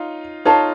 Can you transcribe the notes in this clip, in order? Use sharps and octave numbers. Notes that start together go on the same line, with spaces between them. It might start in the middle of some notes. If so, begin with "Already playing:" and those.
Already playing: D#4 F4 C#5 F5
D#4 F4 A4 C#5 F5 A5